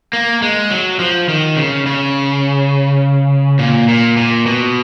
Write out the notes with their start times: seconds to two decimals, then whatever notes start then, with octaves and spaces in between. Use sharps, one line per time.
0.13 A#3
0.42 G#3
0.71 F#3
0.99 F3
1.29 D#3
1.57 C#3
1.86 C#3
3.59 A#2
3.88 A#2
4.17 A#2
4.46 B2